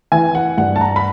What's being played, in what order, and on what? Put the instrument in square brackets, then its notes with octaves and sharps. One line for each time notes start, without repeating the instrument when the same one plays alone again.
[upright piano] E3 G#5
F#5
G2 F#5
A5
A#5
B5